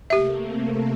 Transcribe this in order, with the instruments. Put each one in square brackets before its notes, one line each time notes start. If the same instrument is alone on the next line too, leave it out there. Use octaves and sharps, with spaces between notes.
[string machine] C3 A3 A#3 [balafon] G4 E5